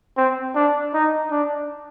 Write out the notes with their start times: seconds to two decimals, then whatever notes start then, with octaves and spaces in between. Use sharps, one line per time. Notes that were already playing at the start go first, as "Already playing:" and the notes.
0.17 C4
0.55 D4
0.94 D#4
1.31 D4